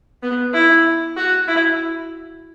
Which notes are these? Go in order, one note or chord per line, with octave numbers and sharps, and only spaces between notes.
B3
E4
F#4
E4